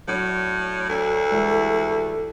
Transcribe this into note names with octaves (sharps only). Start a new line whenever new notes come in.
A2 F#3 D4 C#5
D2 A4
E3 G3 G#3